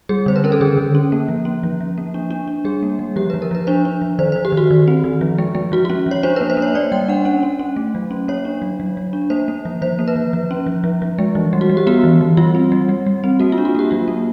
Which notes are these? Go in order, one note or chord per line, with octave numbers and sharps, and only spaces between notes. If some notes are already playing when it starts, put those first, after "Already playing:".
G3 G#4
D3 C5
B4
C#4 A#4
A4
D3 G#4
D3
C#4
A#3
F3
C#4
F3
F3
A#3
D4
D4
D4
G3 G#4
A#3
G3
F3 G4
B4
F3
A#4
F3 B4
D4 C5
D4
F3
D#3 C5
C5
D#3
G4
D#3
F#4
D#3
C4
D#3
F3
G#3
G#3
F3 F#4
F#4
C#4
F3 C#5
D4 C5
B4
A#3
C5
A#3
C#5
A#3 D5
G3 G5
D4 F#5
C#4 F#5
C#4
C#4
A3
F#3
C#4
A#3 C#5
D4
F#3
F#3
F#3
D4
A#3 C5
A#3
F3
F3 C5
A#3
B4
F3
F3
C#4
F3
F3
F3
G#3
E3
G3
F#4
G3
G4
B3 F#4
E3
E3
G3 F4
C4
G3
G3
G3
C4
A#3 F#4
F4
D4
F#4
A#3 G4
F#3 F4
A#3